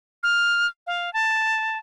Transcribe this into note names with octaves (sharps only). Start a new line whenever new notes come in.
F6
F5
A5